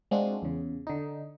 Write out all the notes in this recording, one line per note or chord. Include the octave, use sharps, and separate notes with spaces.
G#3 C4 D4 F4 F#4
E2 C#3
D3 D#4